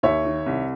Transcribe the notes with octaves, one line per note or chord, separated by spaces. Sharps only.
D#2 C#5 E5
D#3
C2